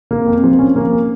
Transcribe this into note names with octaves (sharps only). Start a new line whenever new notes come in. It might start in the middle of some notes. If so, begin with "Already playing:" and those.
A#3
F2
F3
C#4
A#3